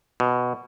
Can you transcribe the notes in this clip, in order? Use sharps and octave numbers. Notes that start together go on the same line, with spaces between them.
B2